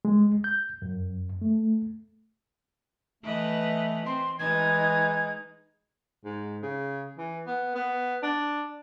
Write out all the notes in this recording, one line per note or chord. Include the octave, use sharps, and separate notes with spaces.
G#3
G6
F#2
A3
E3 A3 B4 D#5
C4 C6
E3 G#3 D#4 G#6
G#2
C#3
E3
B3
B3
D4